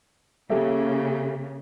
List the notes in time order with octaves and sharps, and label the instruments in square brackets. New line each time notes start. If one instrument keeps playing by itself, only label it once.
[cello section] C#3 A#3 [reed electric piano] G4 A4 E5